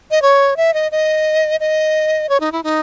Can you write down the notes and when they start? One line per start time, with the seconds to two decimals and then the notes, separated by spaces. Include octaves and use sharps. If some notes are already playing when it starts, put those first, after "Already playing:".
0.11 D#5
0.22 C#5
0.57 E5
0.74 D#5
0.92 D#5
1.60 D#5
2.29 C#5
2.40 D#4
2.52 E4
2.63 D#4